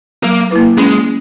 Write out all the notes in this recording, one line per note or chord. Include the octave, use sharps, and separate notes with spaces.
F#3 A#3
A#3 E4 B4
G#3 C#4